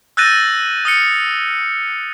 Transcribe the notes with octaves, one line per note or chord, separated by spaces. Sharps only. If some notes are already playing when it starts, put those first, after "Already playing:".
E6 F#6 G6 A6 A#6 D#7
D#6 F6 C#7